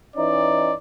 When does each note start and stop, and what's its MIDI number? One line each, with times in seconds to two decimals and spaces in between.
0.16 0.71 52
0.16 0.71 61
0.16 0.71 63
0.16 0.75 74